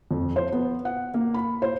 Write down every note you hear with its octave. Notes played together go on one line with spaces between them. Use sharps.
F2
C5
B3
F#5
A#3
B5
C5